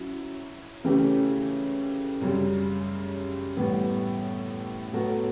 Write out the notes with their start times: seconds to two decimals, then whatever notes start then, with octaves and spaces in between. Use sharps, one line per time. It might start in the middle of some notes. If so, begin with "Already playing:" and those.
Already playing: F#3 C#4 E4
0.84 C#3 E3 A3 C#4 G4
2.21 F#2 C#3 G3
3.57 A2 E3 G3 B3
4.93 A2 F#3 B3 F#4 A4